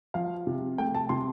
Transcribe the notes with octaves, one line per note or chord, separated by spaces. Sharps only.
F3 F5
C3
A3 G5
A5
C3 C6